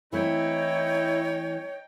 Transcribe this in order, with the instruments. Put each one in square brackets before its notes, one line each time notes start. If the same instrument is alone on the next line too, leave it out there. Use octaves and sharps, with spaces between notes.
[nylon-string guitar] E3 A3 C4 [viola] D#4 G5 [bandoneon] E4 [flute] C#5